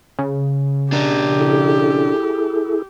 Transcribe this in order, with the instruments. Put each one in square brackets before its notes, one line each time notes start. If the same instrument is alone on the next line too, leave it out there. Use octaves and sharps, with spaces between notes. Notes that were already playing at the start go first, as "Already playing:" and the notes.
[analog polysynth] C#3
[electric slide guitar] D4 A#4 [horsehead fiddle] G4
[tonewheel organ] E4 G#4 A4